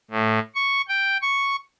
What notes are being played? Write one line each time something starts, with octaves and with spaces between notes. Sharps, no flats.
A2
C#6
G5
C#6